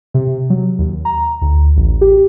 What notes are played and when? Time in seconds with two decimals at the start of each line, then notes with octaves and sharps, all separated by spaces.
0.14 C3
0.50 F#3
0.79 D#2
1.05 A#5
1.41 D2
1.77 A1
2.01 G4